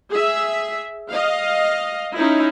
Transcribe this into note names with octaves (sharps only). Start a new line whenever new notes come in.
G#4 E5
D#5 F5
C#4 D#4 E4